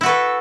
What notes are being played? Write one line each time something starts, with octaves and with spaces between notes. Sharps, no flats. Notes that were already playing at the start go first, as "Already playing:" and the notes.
E4 F#4 A4 B4